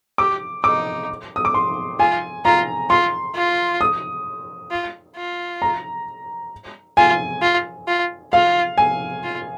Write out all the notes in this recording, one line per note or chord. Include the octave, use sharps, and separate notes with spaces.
G4 D6
D#4 D6
D#6
D6
C6
F4 G#5
F4 A#5
F4 C6
F4
D#6
F4
F4
A#5
F4 G#5
F4
F4
F4 F5
G#5
F4